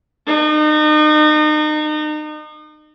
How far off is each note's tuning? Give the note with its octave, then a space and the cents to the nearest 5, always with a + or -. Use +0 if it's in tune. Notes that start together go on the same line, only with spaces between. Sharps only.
D#4 -35